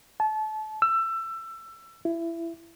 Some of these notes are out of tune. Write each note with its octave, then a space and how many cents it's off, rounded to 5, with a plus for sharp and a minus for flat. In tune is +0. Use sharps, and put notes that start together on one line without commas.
A5 -30
E6 +25
E4 +20